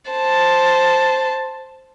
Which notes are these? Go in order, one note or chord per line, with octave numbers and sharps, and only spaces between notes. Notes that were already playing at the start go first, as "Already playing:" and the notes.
C5 A5